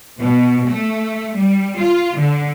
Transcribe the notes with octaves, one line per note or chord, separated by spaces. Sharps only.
B2
A3
G3
F4
D3